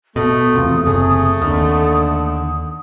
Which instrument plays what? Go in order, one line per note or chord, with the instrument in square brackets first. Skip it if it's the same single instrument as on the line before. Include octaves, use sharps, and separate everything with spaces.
[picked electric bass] B2 [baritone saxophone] A3 [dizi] D#6
[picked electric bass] E2 C3 [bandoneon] F4
[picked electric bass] F#1 C3 [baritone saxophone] A3 [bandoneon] G#4
[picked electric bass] D#2 [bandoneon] D3